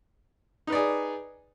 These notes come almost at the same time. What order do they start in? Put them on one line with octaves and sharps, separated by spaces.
D#4 B4 D5 G#4